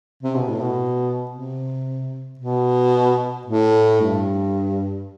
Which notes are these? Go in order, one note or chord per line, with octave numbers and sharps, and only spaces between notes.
C3
B2
A2
B2
C3
B2
A2
G2